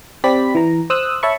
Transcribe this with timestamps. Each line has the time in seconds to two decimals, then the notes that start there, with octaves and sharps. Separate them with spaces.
0.24 C4 G4 D5 B5 B6
0.55 E3 A#5
0.90 C5 D#6 E6 F#6
1.23 C#5 E5 A5 B5 C#6